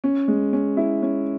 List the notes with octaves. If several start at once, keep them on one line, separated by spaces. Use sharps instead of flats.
C#4
G#3
C#4
E4
C#4